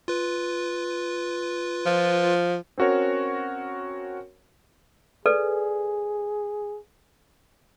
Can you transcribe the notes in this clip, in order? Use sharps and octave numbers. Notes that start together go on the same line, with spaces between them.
F4 B4
F3
C4 C#4 F#4 A#4 C#5
G#4 A4 B4 D5